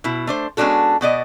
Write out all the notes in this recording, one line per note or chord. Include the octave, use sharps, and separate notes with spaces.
B2 E4
A3 D4 C5
G#3 B3 C#4 D4 F#4 A4
B2 B3 D5 D#5